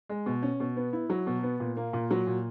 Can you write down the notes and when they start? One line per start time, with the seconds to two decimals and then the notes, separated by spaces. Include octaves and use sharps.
0.09 G#3
0.26 B2
0.43 C#4
0.60 B2
0.77 B3
0.93 E4
1.10 F#3
1.27 B2
1.43 B3
1.60 A#2
1.77 A#3
1.93 A#2
2.11 F#3
2.27 A#2